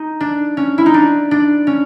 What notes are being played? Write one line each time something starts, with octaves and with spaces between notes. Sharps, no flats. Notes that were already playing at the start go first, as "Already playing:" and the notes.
Already playing: D#4
D4
C#4
E4
D#4
D4
D4
C#4